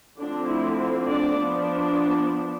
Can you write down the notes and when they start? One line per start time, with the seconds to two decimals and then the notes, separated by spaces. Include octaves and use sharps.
0.19 D3 F3 A3 C4 D4
0.48 E4
1.06 D4 D5
1.35 F3 B3 D4